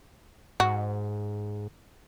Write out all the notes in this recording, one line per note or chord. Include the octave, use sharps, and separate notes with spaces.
G#2 F#4